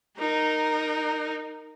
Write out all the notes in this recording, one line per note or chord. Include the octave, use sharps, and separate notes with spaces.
D#4 A#4